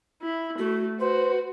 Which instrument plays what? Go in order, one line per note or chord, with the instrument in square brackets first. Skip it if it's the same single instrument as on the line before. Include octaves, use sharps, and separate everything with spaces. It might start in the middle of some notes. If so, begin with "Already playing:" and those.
[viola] E4
[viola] A3 [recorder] F#4
[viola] F#4 [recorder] B4 [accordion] C5